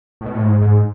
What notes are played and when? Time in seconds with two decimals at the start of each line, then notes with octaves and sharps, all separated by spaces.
0.21 A2
0.26 B2
0.34 A2
0.43 G#2
0.61 G#2